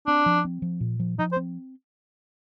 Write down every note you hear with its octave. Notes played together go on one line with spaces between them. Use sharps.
C4 D4
F3
C4
F3
A#2
F3
F3 D#4
C5
C4